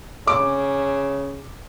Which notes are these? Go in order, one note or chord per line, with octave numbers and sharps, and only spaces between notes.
C#3 D6